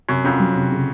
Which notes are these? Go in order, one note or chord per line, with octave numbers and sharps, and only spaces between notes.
F#2 C3
F2 C#4
F#3
C3
C#3